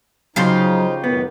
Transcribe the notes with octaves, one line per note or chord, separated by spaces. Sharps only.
C#3 F3 F#3 D#4 F4 G4 A5 C6
F#2 A2 D#3 B3